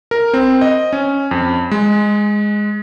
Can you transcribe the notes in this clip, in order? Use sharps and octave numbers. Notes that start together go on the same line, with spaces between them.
A#4
C4
D#5
C#4
F2
G#3